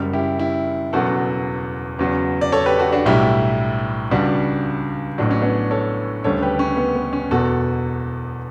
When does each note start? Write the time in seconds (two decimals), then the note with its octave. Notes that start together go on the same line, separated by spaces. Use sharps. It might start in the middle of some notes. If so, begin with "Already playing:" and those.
Already playing: F#1 F#2 C#3 G3
0.13 E4 G4
0.39 E4 G4
0.93 E1 E2 C#3 F#3 F#4 A4
1.99 E2 C#3 F#3
2.41 D5
2.52 A4 C#5
2.66 G4 B4
2.79 F#4 A4
2.92 D4 F#4
3.06 B1 A2 G3 E4 G4
4.11 C#2 C#3 G3 D4 F#4
5.18 A1 A2 F#3 D4
5.31 C#4
5.42 B3 D4
5.71 A4 C#5
6.24 D2 C#3 G3 A4 C#5
6.42 G4 B4
6.59 C#4
6.77 B3
6.95 B3
7.13 C#4
7.31 E1 E2 B2 F#4 A4